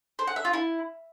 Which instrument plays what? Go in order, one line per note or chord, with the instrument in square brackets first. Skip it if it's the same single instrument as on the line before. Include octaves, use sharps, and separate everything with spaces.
[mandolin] C5
F#5
E5
F4
E4